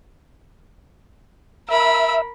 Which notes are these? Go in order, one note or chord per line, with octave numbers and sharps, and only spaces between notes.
A#4 E5 B5